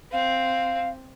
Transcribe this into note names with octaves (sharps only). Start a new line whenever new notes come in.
C4 F5